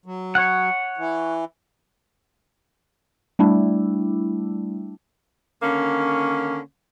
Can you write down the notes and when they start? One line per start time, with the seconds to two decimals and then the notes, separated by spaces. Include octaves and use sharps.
0.06 F#3
0.35 C#5 F#5
0.97 E3
3.39 G3 A3 D4 E4
5.63 D3 D#3 A#3 C#4